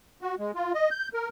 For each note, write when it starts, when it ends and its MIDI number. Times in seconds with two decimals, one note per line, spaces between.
0.22 0.35 66
0.39 0.51 56
0.55 0.72 65
0.74 0.90 75
0.91 1.09 91
1.14 1.29 70